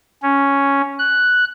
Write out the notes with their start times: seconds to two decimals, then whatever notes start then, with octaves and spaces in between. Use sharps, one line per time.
0.22 C#4
0.99 F#6